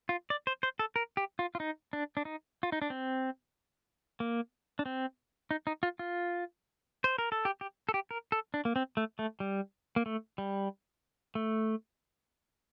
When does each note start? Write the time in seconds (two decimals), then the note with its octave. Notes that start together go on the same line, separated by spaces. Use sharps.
0.09 F4
0.30 D5
0.47 C5
0.63 C5
0.79 A4
0.96 A#4
1.17 G4
1.39 F4
1.55 F4
1.60 D#4
1.93 D4
2.17 D4
2.25 D#4
2.63 F4
2.72 D#4
2.82 D4
2.90 C4
4.20 A#3
4.79 D4
4.86 C4
5.51 D#4
5.67 D#4
5.83 F4
5.99 F4
7.04 C5
7.18 A#4
7.32 A4
7.45 G4
7.61 G4
7.89 A4
7.94 G4
8.11 A#4
8.32 A4
8.54 D4
8.65 A#3
8.76 C4
8.97 A3
9.19 A3
9.40 G3
9.96 A#3
10.06 A3
10.38 G3
11.35 A3